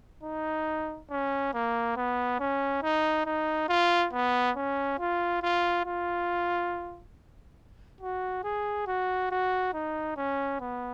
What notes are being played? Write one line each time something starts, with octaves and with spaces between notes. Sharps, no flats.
D#4
C#4
A#3
B3
C#4
D#4
D#4
F4
B3
C#4
F4
F4
F4
F#4
G#4
F#4
F#4
D#4
C#4
B3